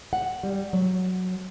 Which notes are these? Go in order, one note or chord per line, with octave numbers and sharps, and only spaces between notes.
F#5
G3
F#3